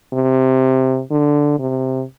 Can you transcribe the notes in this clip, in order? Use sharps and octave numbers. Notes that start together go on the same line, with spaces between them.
C3
D3
C3